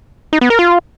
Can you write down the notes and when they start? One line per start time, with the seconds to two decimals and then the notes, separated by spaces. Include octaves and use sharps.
0.33 D#4
0.41 B3
0.50 A#4
0.59 F4